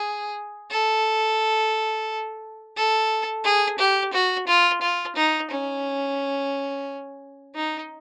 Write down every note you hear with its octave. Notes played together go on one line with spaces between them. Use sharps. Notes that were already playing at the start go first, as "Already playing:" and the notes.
Already playing: G#4
A4
A4
G#4
G4
F#4
F4
F4
D#4
C#4
D#4